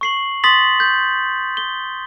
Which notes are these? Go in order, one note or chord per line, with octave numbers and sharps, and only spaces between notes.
C#6 C7 F#7
C6 D#6 A6 B6 F#7
G6
G7